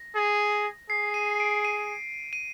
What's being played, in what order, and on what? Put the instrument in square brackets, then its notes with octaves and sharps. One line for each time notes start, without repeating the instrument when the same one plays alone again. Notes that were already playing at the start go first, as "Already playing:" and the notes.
Already playing: [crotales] A#6
[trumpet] G#4
[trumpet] G#4 [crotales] C7
[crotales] D#7
D7
D#7
D#7